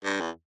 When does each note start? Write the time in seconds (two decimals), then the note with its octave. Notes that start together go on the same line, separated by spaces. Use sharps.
0.04 G2
0.20 E2